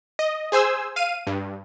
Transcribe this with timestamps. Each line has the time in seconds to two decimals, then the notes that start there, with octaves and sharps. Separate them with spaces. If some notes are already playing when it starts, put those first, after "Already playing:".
0.19 D#5
0.52 G#4 C5 G#5 E6
0.96 F5 D#7
1.27 G2